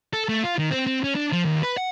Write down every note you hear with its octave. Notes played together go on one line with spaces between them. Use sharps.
A4
A3
F4
D#3
C4
C4
C#4
D4
F3
D#2
B4
F#5